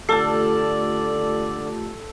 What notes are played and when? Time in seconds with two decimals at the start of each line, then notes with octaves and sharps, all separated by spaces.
0.09 D3 A3 F4 G4 A4 D5 A5